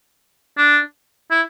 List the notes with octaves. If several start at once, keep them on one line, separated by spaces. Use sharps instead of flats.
D4
E4